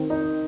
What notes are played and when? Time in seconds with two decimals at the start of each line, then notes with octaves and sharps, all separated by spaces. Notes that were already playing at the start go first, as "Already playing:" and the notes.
Already playing: D#3 C4
0.10 D#4